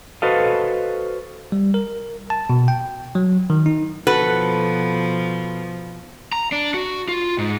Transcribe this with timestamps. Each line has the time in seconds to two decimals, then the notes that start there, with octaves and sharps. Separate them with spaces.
0.22 F#4 A4 B4 C5 D#5 F5
1.52 G3
1.74 A#4
2.30 A5
2.50 B2
2.68 G5
3.15 F#3
3.50 D#3
3.66 D#4
4.07 B2 F3 F#4 A4 B4
6.32 A#5
6.52 D4
6.74 F#4
7.08 F4
7.38 G#2